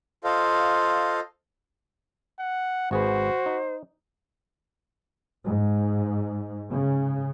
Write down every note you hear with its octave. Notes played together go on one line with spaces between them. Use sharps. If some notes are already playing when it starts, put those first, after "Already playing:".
F4 A4 C5 D#5 F5
F#5
G#1 F#4 G#4 B4 C5
D#4
G#2
C#3